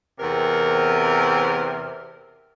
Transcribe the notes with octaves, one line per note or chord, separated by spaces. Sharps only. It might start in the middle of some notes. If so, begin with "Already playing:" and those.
E2 C3 C4 A#4